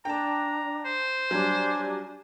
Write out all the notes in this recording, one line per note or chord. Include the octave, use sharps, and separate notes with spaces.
D4 G5 A5 A#5
C5
F#3 G3 D4 G#5